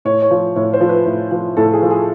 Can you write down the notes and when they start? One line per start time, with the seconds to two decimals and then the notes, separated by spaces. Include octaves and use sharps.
0.05 A2 C#5
0.22 C#5
0.31 F3
0.56 A2 C#5
0.73 C5
0.81 F3
0.89 B4
1.06 A2
1.31 F3
1.57 A2 A4
1.73 G#4
1.82 F3
1.90 G#4